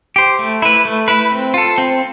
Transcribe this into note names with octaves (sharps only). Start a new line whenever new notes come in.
G4 C5
A3
E4 B4
A3
E4 B4
C4
F4 A4
C4